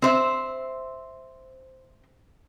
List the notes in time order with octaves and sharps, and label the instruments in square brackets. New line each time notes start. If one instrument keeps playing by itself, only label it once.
[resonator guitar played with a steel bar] C4 C5 E5